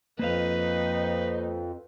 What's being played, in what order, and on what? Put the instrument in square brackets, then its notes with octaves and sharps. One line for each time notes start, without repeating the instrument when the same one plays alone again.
[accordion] F2 [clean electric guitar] A#3 C5 F5 [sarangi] D#4 [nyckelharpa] B4